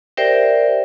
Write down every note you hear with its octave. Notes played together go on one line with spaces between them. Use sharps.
G4 A#4 C5 D5 E5 G5